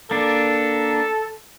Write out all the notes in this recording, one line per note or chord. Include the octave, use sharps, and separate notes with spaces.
A#3 D4 A4